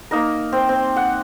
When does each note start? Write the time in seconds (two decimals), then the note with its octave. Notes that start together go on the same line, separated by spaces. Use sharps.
0.11 A#3 D#4 A#4
0.53 C4
0.69 C4
0.96 F#5